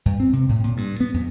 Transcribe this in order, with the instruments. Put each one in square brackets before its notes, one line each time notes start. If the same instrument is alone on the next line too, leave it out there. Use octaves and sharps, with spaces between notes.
[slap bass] G2
C4
C3
A2
A#2
G2
B3
F2